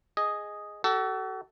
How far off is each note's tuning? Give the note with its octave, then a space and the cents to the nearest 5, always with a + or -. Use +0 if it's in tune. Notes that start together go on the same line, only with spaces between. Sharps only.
G#4 +0 D#5 +0
F#4 +40 A4 +0